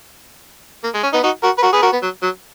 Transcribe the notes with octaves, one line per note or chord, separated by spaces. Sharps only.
A#3
G#3
C#4
B3 D#4
D#4 F#4
F#4 A#4
B4
F#4 A#4
G#4 B4
F#4 A#4
B3
F#3
F#3